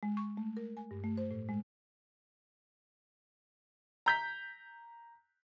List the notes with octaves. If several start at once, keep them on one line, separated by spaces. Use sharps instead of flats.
G#3
C#6
A3
A#4
G#5
G2
A3
C5
A2
G#3
A#5 G6 B6